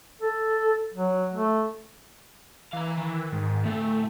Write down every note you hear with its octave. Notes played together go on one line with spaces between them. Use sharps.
A4
F#3
A3
E3 F5 A#5
D#3
G#2
D2 A2 A3